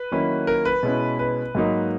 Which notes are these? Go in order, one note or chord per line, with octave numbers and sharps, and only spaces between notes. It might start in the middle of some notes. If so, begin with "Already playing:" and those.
Already playing: B4
D#3 F#3 A#3 C#4 E4
A#4
B4
B2 G#3 C#4 E4
B4
G#2 F#3 A#3 D#4